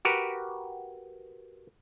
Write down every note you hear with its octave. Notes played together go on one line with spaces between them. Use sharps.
F#4 G4 A#4 B4